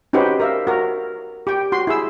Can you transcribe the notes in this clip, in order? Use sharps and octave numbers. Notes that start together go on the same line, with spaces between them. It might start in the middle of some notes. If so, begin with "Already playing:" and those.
C#4 D#4 F#4 G4 B4 C5
A#4 E5 F5
F#4 A#4
G4 G5
F#4 C6
E4 G#4 E6